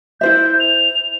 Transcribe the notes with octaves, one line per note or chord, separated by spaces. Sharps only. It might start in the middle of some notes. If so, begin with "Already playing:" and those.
E4 C5 E5 G6
F7